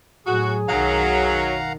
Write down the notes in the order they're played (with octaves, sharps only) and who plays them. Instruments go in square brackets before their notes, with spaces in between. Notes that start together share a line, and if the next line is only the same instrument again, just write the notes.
[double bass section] A2 F#3 [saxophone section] F#4 [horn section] G#4
[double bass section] B1 F#2 D#3 [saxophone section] F#3 [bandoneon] F5 F#5 A#5